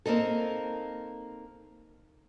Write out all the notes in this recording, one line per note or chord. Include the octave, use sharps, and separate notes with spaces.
A#3 C4 D#4 A4